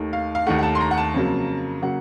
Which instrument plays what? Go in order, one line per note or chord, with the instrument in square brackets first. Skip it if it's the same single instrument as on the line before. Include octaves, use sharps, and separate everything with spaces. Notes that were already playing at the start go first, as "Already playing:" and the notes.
Already playing: [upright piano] D#2 D#3 A3
F5
F5
D#2 D#3 A3 F#5
F#5
A5
C6
A#5
F#5
A5
F2 C#3 F#3 A#3
C#3 F#3 A#3 F#5